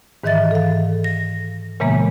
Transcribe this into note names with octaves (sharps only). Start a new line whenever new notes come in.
G#2 D#3 E3 D#5 E5 A6
A4 F5
A#6
A#2 C#3 E3 G#3 A#3 B3